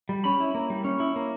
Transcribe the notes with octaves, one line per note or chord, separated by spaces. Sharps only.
G3
C#4 B5
E4
A#3
G3
C#4
E4
A#3